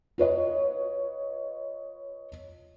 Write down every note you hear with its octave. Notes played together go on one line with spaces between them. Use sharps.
F4 B4 C#5 D#5